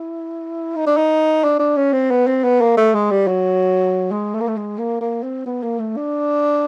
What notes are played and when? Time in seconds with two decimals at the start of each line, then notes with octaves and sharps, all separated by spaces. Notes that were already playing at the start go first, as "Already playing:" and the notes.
Already playing: E4
0.76 D#4
0.87 D4
0.97 D#4
1.43 D4
1.59 D4
1.77 C#4
1.93 C4
2.11 B3
2.27 C4
2.44 B3
2.61 A#3
2.77 A3
2.94 G#3
3.11 G3
3.27 F#3
4.11 G#3
4.34 A3
4.40 A#3
4.48 A3
4.57 G#3
4.78 A#3
5.01 A#3
5.23 C4
5.46 B3
5.63 A#3
5.79 A3
5.96 D4